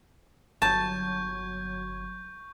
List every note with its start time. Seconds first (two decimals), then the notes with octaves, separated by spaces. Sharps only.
0.62 G1 F#3 A5 C#6 G6 G#6